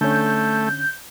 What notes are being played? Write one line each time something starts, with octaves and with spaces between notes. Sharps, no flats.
D3 A3 C#4 G6